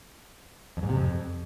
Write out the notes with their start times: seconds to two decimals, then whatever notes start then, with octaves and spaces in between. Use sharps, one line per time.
0.77 F2
0.83 G#2
0.89 C3
0.95 F2